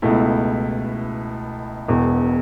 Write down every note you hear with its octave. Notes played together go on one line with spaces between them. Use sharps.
C#2 B2 A3 E4
E1 E2 B2